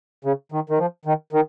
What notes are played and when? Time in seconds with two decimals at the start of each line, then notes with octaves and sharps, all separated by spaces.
0.25 C#3
0.52 D#3
0.69 D#3
0.78 F3
1.05 D#3
1.33 D#3